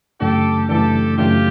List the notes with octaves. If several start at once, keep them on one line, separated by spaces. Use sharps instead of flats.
F#2 C#3 E3 A3 D4 G4 A4
F#2 C#3 E3 A3 D4 G4 A4
F#2 C#3 E3 A3 D4 F4 G4